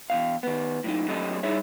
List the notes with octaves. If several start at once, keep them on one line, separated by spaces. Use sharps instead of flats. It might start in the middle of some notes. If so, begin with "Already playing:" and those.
E2 C3 F5
D#3 B3
A2 F#3 D#4
F#3 A3 C#4 G4 A4 D#5
G3 D#4 E4 G#4 C#5 E5